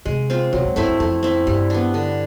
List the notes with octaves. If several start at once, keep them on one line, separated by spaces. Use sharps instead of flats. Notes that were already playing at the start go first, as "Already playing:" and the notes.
C3 G#3
C4 F4
C3 F#3
G#2
G2 A3 C4 E4
G2
F2 A3
C4 E4
G2 G3
B3 D4
D3